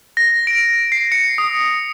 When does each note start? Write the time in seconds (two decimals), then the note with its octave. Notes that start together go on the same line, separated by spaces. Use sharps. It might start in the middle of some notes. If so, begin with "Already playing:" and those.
0.17 A#6
0.47 D7
0.92 C7
1.12 C#7
1.38 D#6